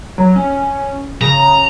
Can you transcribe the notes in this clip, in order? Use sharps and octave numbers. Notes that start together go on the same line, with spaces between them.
F#3
C#4
C#3 A#5